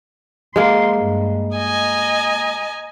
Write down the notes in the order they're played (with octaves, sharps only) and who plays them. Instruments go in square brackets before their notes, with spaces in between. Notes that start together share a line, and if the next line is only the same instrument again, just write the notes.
[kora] G#3 A#3 [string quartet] C6
[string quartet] G2
D#5 G#5 A#5